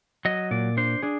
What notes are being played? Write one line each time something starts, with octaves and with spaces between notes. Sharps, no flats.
F#3 D#5
A#2 D5
D4 C5
D4 G#4